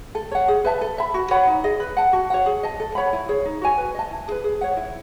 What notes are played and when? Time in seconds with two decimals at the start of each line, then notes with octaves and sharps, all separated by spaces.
0.15 A4
0.31 C#5 F#5
0.48 G#4
0.65 B4 E5 A5
0.81 A4
0.98 E5 B5
1.14 F#4
1.31 C#5 F#5 B5
1.47 D#4
1.64 G#4 D#5
1.80 B4
1.97 F#5 A5
2.13 F#4
2.30 C#5 F#5
2.46 G#4
2.63 D#5 A5
2.80 A4
2.95 C#5 F#5 B5
3.13 E4
3.29 G#4 C#5
3.45 D#4
3.61 F#4 C#5 G#5
3.78 B4
3.95 D#5 A5
4.11 E4
4.28 G#4 B4
4.44 G#4
4.61 C#5 F#5
4.77 E4